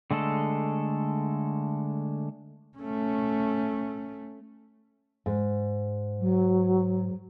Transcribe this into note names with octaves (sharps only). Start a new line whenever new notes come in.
D3 G#3 A3 A4
A3 C#4
G#2
F#3